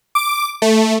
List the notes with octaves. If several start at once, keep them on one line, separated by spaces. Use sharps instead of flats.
D6
A3